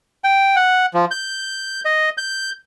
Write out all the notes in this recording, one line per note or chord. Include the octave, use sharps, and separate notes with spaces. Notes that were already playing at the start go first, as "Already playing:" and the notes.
G5
F#5
F3
G6
D#5
G6